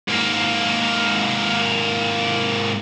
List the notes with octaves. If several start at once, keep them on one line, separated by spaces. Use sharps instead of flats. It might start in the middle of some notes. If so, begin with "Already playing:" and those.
G#2 A#3